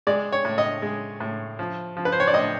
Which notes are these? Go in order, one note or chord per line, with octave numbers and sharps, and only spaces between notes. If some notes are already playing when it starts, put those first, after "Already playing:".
G#3 D5
C#5
A2
D#5
G#3
A2
F3
F3
B4
C5
C#5
D5
A2 D#5